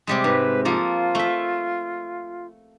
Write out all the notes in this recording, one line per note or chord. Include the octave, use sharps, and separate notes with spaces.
C3 G3 G#3
G#2 B4
F3 A#3 F4 A4
A3 E5